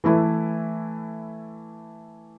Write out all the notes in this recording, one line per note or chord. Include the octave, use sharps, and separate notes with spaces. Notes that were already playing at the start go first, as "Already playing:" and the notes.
E3 A3 E4 B4